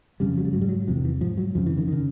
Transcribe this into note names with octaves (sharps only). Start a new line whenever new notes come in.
F2 C#3 G3
F#3
G3
G#2 F#3
G3
F#3
E2 C3 F3
D#3
E3
G#2 F3
F#3
F2 C#3 F3
E3
D#3
D#3
C#3